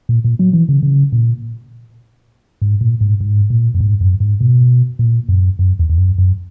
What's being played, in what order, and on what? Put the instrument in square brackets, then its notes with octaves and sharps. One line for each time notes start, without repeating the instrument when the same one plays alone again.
[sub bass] A#2
A#2
F#3
E3
C#3
C#3
A#2
G#2
A#2
G#2
G#2
A#2
F#2
G#2
F#2
G#2
B2
A#2
F#2
F#2
E2
E2
F#2
F#2